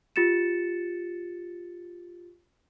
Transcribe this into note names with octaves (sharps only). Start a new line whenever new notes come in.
F4 G4 A6 C#7 E7